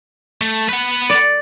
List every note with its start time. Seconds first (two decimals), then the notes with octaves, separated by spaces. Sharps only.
0.41 A3
0.69 B4 F#5
1.10 D5